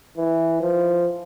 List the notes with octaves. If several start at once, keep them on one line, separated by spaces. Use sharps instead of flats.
E3
F3